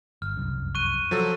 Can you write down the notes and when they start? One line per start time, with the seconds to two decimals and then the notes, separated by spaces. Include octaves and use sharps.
0.22 G1 F6
0.36 F1 C2 F#2
0.75 C#6 F#6 D#7
1.11 F3 F#3 A4